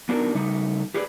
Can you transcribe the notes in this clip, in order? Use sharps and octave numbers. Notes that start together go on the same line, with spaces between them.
B3 D4 D#4 F#4 A#4
C#3 G3 A3 D#4
G4 G#4 B4 D5